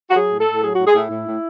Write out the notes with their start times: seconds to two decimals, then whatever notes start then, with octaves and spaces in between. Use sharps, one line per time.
0.10 F#4
0.16 F#3 G#4
0.31 A2
0.39 A4
0.47 A2
0.63 F#3 G#4
0.75 A2 F#4
0.87 G#4
0.95 A2 E4
1.10 A2
1.27 A2